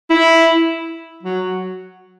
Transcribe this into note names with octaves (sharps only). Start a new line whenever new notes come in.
E4
F#3